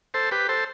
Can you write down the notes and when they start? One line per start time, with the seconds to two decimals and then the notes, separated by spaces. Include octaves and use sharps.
0.14 A4 C5
0.31 G4 B4
0.49 A4 C5